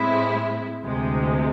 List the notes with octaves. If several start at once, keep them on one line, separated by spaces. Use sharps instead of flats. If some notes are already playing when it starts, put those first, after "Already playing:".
Already playing: A2 G#3 C4 E4
D2 C3 G#3